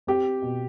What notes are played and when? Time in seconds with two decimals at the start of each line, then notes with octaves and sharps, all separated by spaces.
0.07 C4 G4
0.42 B2